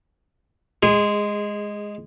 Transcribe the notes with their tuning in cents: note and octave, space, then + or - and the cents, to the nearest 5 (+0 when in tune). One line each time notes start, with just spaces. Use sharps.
G#3 +0 G#4 -20